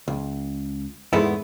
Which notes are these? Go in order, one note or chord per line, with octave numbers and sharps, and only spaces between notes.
C#2
E2 G#2 G#3 A3 B3 E4